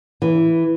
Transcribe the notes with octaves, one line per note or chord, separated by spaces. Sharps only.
E3